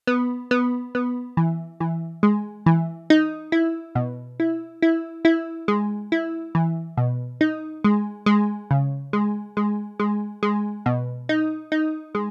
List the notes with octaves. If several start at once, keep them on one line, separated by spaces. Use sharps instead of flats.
B3
B3
B3
E3
E3
G#3
E3
D#4
E4
B2
E4
E4
E4
G#3
E4
E3
B2
D#4
G#3
G#3
C#3
G#3
G#3
G#3
G#3
B2
D#4
D#4
G#3